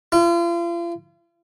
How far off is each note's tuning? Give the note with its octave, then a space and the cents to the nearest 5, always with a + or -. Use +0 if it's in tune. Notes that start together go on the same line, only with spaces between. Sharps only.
F4 -40